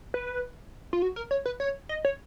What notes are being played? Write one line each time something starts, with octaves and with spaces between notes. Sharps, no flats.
B4
F4
F#4
A#4
C#5
B4
C#5
D#5
C#5